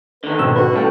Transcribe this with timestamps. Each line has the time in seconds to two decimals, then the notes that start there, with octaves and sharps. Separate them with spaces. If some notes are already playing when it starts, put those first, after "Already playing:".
0.24 D3 D#3 B4
0.39 G#2 B2 C4 E6
0.56 F#4 B4
0.73 C2 A2 C#4 A4 G5